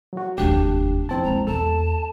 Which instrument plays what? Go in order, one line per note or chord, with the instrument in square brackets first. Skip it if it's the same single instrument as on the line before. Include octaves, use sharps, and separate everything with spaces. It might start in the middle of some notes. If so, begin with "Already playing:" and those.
[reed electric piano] F#3 F#4
[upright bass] F1 D#2 [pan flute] D4 [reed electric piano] G4
[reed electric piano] F2 C4 A5 [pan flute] E4
[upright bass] G#3 A#3 [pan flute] A#5
[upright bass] E2 [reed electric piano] A4 [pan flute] A5